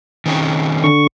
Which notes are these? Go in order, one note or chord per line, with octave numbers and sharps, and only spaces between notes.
D#3 C4 C#4
D3 C#6